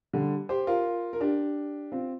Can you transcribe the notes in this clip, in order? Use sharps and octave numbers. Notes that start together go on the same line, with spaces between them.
D3 G3
G4 C5
F4 A#4
A#4
D4 G4
C4 F4